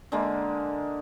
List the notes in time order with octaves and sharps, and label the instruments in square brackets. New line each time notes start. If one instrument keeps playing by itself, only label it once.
[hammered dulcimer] D3 G#3 A#3